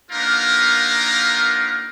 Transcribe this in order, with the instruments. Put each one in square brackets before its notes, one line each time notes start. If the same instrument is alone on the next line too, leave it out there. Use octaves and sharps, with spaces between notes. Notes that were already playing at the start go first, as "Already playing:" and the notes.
[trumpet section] A#3 B3 D4 D#4 F4 A#4